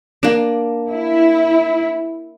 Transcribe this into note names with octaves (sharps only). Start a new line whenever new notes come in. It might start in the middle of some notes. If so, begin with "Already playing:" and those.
A#3 D4
E4